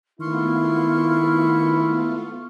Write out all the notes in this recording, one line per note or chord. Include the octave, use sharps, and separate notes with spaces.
D#3 A3 B3 E4 F4 C6 C#6 F6